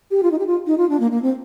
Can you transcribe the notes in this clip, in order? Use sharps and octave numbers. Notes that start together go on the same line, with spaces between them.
G4
F4
D#4
G4
F4
D#4
F4
D4
A#3
A#3
C4